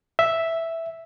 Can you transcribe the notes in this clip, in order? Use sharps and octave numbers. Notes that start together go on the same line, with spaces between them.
E5